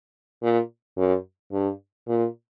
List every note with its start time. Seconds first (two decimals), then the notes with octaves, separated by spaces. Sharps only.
0.43 A#2
0.97 F#2
1.52 G2
2.08 A#2